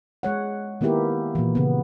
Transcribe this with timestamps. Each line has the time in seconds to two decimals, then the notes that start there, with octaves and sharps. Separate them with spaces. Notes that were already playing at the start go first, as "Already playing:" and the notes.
0.23 G#3 C#5 F#5
0.81 D#3 A#3 B3 E4 G4 A#4
1.35 A#2 E3
1.55 C#3 B3